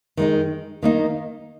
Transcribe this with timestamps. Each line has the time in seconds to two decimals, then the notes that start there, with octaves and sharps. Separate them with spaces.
0.17 D#3 G#3 D#4
0.83 D#3 A#3 D#4